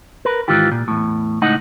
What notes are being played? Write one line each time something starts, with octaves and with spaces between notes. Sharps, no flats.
A#4 B4
G#2 D#3 E3 F4 G4
A#2
E2 A2
C#2 A2 D#4 D#5 F#5